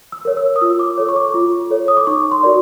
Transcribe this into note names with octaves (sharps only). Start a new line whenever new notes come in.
E6
A#4 C#5
E6
D#6
F4 E6
D6
A4 C#5
C#6
D6
F4
A4 C#5
D#6
D6
D#4 C#6
C6
F#4 A#4 D5